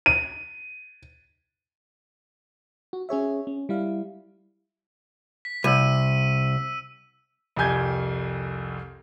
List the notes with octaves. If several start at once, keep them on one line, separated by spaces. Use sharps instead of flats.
D#7
F#4
C#4 G#4 C#5 E5
C#4
G3 E4 F5
B6
C2 E6 D#7
C2 F2 G4 G#5 G6 G#6